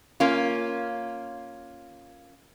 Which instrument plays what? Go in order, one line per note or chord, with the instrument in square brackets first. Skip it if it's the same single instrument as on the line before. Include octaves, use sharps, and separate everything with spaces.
[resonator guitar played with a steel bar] A#3 C#4 F4